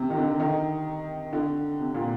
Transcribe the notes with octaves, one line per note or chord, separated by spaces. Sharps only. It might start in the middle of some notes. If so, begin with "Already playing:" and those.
Already playing: C3
D#3
D3
D#3
D3
C3
A#2